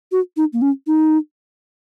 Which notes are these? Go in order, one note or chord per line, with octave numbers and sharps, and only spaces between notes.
F#4
D#4
A#3
C#4
D#4